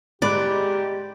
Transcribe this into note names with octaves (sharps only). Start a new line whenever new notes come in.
G#2 G4 D5 B5 F#6